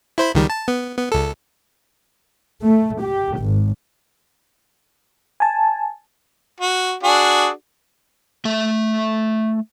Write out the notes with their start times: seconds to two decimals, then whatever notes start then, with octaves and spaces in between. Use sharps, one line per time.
0.18 E4 C5 B5
0.35 C#2 D#3 G3
0.50 A5
0.68 B3
0.97 B3
1.12 C#2 A4
2.63 A3
3.02 G4
3.39 G#1
5.40 G#5 A5
6.60 F#4
7.03 D4 F#4 G#4
8.45 A3 E5